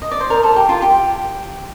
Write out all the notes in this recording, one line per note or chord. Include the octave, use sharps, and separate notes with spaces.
D#5
D5
C5
A#4
A4
G4
F4
G4